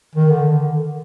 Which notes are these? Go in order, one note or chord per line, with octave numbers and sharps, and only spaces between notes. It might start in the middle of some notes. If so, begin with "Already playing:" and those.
D#3
D3